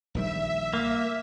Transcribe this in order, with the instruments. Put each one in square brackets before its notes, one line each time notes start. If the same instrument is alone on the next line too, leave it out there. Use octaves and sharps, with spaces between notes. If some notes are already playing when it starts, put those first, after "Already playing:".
[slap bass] A#1 D#3 G3 [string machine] E5
[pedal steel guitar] A#3